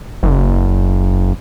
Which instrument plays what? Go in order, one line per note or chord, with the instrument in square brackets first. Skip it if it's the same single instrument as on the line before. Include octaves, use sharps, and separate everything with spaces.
[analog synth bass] F#1